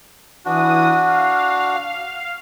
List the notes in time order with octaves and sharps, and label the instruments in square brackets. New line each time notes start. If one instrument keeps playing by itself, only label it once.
[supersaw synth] E3 D#6 [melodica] D4 F#4
[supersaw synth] F5